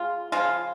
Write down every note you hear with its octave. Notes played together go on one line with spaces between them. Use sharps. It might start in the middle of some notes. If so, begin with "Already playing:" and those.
Already playing: C#3 G#3 F4
C#3 F3 G#3 F4